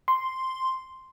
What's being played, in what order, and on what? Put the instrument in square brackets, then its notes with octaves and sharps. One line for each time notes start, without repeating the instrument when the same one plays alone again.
[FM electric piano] C6